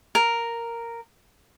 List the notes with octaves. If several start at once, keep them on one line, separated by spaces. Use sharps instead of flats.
A#4